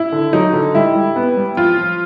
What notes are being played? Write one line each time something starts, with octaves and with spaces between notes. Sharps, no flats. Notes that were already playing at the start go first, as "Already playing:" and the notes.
Already playing: E4
D3
F#3 D#4
D3
G3 E4
G3
B3
G3
F3 F4
F3